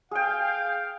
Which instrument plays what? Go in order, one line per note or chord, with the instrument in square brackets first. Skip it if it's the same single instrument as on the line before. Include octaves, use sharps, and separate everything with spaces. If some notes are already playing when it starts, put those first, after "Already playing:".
[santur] G#4 G5 [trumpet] F5